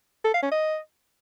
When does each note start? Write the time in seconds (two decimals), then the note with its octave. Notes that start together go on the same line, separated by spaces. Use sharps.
0.25 A4
0.34 F5
0.43 C#4
0.52 D#5